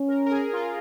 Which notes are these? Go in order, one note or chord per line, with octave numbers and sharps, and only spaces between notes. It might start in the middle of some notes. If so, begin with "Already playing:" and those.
Already playing: C#4
A#4
A#4
G#4
F4